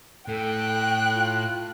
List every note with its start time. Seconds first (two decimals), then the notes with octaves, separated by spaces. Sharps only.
0.28 A2 A4 G5 F#6
1.14 F4